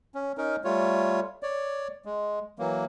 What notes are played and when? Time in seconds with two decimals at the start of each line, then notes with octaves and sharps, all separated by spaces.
0.15 C#4
0.38 C#4 D#4 A#4
0.64 G3 A3 F4 C#5
1.43 C#5 D5
2.05 G#3
2.59 E3 F#3 A#3